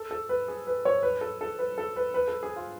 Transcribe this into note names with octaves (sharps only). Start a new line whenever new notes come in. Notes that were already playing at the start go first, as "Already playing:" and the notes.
Already playing: A4
A4
B4
G#4
B4
C#5
B4
A4
A4
B4
A4
B4
B4
A4
G#4
F4